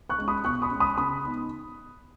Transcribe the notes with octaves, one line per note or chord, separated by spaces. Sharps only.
C#6 F#6
G#3 C#4
B5 D#6
B2 C#6 F#6
B5 D#6
G#3 C#4
B5 D#6
C#3 B5 D#6
B3 D#4